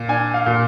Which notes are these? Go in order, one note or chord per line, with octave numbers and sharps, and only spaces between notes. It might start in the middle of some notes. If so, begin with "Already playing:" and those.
Already playing: A#2
D4 G#5
F5
A#2